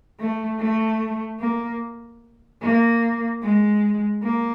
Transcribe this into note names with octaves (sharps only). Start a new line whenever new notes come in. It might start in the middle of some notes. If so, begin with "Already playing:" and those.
A3
A3
A#3
A#3
G#3
A#3